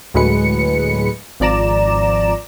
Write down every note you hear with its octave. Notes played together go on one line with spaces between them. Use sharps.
D2 A2 F#3 G#3 B4 C#7
G#1 F3 D5 A#5 E7